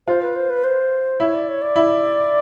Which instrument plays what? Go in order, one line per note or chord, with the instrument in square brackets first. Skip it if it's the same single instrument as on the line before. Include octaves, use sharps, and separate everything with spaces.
[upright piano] F4 [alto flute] C5
[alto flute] B4
C5
B4
C5
[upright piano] E4 [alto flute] C#5
[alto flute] D5
C#5
D5
[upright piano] E4